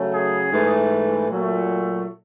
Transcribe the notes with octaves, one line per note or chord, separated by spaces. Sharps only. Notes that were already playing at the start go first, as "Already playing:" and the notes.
Already playing: C#3 F#3 A3
G#4
G#2 E3 A3
A#2 F#3 A3